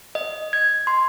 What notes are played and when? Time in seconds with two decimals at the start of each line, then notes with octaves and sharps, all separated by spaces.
0.15 D#5
0.53 G#6
0.87 C6